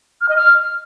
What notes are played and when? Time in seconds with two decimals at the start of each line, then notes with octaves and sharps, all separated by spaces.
0.21 F6
0.29 D#5
0.36 F6